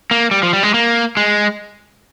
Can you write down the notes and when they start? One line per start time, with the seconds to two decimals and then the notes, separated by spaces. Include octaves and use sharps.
0.11 A#3
0.31 G3
0.43 F3
0.53 G3
0.63 G#3
0.74 A#3
1.17 G#3